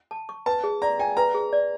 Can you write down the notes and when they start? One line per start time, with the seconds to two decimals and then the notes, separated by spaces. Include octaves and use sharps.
0.11 A5
0.29 C#6
0.46 B4 A5
0.64 G#4
0.82 D5 A#5
0.99 G5 G#5
1.17 B4 A#5
1.34 G#4
1.53 D5